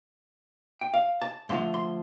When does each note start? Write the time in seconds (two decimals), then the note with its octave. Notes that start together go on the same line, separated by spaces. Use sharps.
0.81 G5
0.94 F5
1.22 A5
1.49 G2 D3 F3 A3 C6
1.74 C6